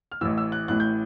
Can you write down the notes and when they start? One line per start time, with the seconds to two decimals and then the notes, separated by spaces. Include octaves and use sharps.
0.12 F6
0.21 A1 A2 E3 E6
0.38 E6
0.52 F#6
0.68 A1 A2 E3 F#6
0.80 G6